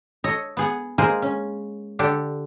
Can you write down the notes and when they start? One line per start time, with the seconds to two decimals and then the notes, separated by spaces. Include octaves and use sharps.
0.24 A4 C#5 D#5
0.57 B3 G#4 F#5
0.98 G#3 A#3 G#4 A#4 C5 D#5
1.22 C#4
1.99 D3 D4 G4 A4